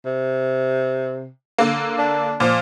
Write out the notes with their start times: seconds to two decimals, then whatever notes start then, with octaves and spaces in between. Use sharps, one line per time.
0.05 C3
1.58 D3 A#3
1.98 D4
2.40 A#2 F3